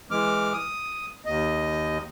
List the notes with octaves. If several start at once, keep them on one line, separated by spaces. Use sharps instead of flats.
E3 G#3 D6 F6
D#6
D#2 D#5